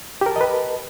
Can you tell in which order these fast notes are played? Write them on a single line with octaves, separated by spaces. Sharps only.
G4 A#4 A5 D#5 B4